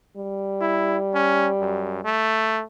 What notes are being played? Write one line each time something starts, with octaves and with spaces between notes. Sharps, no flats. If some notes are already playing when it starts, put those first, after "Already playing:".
G3
E4
C#4
F#2
A3